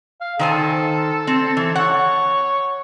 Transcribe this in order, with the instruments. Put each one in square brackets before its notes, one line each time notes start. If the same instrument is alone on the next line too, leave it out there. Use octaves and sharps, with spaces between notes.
[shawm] F5
[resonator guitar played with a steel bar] D#3 C5 G#5 [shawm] A4
[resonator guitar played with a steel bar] C4
E3
[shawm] C#5 [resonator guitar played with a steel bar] F#5